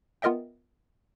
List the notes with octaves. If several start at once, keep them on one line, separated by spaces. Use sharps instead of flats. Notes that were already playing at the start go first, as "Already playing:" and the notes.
B3 F4 A#4 D#5 E5 G5